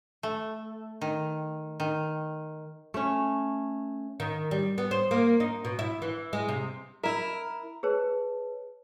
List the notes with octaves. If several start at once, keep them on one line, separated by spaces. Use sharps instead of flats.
A3
D#3
D#3
A3 C#4
D#3
G3
B3
C5
A#3
D#4
B2
E4
E3
G#3
C3
E4 A#4 E5
G#4 B4 C#5 A5